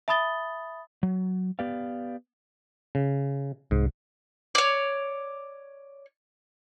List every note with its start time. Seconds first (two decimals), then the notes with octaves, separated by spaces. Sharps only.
0.08 E5 A5 B5 D#6 A6 G7
1.03 F#3
1.59 B3 G4 B4 D5 F5
2.95 C#3
3.71 C2 G#2
4.55 C#5 D5